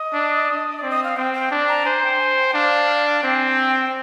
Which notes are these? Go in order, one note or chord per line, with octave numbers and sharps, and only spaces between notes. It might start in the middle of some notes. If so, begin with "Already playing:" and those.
Already playing: D#5
D4
D5
C4
D#5
F5
C4 G5
G5
D4
A#5
C5 G#5
G5
G#5
G5
G5
D4 F5
C4 G5
G#5
G5